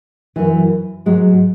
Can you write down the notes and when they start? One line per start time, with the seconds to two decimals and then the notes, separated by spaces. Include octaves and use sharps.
0.36 F#2 E3
1.06 G#2 F#3 G#3